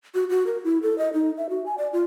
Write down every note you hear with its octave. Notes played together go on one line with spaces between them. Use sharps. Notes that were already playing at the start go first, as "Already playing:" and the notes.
F#4
F#4
A#4
E4
A4
D#5
D#4
E5
F#4
G#5
D5
F4